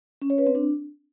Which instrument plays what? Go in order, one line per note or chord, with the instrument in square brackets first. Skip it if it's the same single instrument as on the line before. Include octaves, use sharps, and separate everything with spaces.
[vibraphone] C#4
C#5
B4
C4
D4